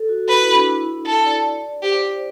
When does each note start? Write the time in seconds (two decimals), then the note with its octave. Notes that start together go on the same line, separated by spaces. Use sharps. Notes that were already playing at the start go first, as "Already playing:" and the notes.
Already playing: A4
0.09 F#4
0.28 F#4 B4
0.41 E4
0.54 D4
0.67 E4
1.06 A4
1.25 D5
1.83 G4 C5
2.02 C5